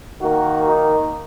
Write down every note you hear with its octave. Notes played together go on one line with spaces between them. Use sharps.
D#3 A#3 F#4
D#4